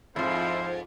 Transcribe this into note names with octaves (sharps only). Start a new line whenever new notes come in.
F2 G#2 F3 E4 C5